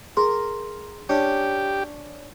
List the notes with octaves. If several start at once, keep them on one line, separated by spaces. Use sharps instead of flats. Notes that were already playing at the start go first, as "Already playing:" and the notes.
G#4 A#4 C6
C#4 D4 G4